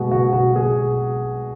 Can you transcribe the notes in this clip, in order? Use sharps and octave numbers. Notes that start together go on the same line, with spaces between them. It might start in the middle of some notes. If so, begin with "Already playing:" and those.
Already playing: B2 G#3 F#4 G#4
B2 F#4
B2 F#4
B2 G#4